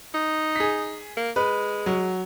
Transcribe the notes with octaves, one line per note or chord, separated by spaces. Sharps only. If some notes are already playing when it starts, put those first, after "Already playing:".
D#4
G#4 B6
A#3
G#3 B4
F#3